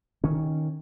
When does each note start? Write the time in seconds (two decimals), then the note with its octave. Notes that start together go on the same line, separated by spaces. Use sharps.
0.24 D#3 C#4